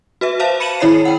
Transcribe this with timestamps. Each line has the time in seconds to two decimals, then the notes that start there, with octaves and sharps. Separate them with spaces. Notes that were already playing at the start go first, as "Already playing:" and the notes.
0.21 F#4 B4 E5
0.39 C5 E5 F5 A5
0.60 B5 C#7 D#7 E7 F#7
0.80 D#3 E4 C#5 B5 C7
1.05 F#5 G5